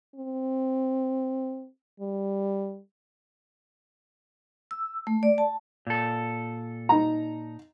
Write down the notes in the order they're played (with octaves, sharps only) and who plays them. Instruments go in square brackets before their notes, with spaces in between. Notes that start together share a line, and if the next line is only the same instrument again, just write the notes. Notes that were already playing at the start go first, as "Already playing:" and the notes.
[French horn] C4
G3
[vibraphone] E6
A3
D5
A5
[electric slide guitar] A#2 A4
[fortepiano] D#4 A#5